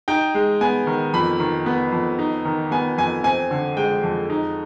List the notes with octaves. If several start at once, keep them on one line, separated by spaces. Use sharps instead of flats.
D#4 G5
G#3
B3 G#5
D#3
F2 B5
D#3
B3
F2
D#4
D#3
B3 G#5
F2 G#5
C4 G#5
D3
G#3 G5
F2
D#4